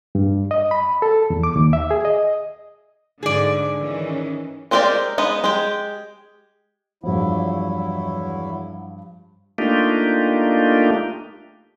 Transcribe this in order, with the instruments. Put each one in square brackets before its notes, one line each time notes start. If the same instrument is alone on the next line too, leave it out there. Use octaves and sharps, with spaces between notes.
[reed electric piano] G2
D#5
B5
A4
E2
D6
D#2
E5
G#4
D#5
[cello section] G#2 D3 [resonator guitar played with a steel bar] G#4 D5
[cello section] D#3 E3 C#4
[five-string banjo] G#3 C4 G4 A#4 D5
G#3 B3 D#4
G#3 G4
[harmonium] E2 F#3 E4 [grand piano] G2 F3
[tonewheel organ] A3 A#3 D4 D#4 F4 G4